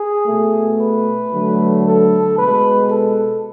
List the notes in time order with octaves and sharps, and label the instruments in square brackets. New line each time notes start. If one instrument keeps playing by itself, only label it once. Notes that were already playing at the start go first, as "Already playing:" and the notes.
Already playing: [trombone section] G#4
B2 A3
B4
D3 F#3 A3
A4
B2 G#3 B4
A4